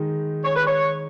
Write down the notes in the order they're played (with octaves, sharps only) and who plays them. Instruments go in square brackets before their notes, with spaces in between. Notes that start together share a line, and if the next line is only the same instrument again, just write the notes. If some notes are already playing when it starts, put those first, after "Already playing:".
Already playing: [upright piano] D#3 G#3 D#4
[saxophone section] C#5
B4
C#5